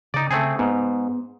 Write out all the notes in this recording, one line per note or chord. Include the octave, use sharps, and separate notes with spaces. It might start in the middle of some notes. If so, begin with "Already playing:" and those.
C#3 D#4 D5
C#3 A3 C4 G#4
G#2 B3